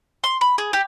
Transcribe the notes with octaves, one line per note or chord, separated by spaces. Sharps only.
C6
B5
G#4
G4